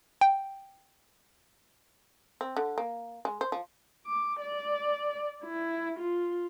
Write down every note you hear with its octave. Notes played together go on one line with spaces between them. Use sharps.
G5
C4
D3
A#3
G#3
C5
F3
D6
D5
E4
F4